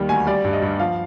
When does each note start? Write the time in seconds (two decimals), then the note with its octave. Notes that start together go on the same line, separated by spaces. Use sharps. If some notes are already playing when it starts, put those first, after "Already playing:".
Already playing: D#2 D#3 G3
0.09 D2 G#5
0.27 G3 D5
0.44 G2
0.53 D#5
0.62 G2
0.79 F3 F5